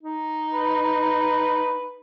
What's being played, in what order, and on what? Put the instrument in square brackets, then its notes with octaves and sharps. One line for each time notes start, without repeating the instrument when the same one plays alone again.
[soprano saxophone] D#4
[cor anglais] B4